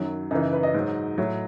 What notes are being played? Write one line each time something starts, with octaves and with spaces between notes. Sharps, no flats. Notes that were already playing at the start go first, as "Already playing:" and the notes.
Already playing: F#2 D#3 F#3
F#2 C#3 E3 D#4
B4
D#5
G#2 F#3
A2 F#3